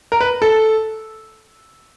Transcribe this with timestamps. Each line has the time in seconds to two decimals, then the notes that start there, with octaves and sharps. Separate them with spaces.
0.12 A#4
0.21 B4
0.42 A4